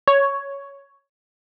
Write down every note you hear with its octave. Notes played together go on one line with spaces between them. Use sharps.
C#5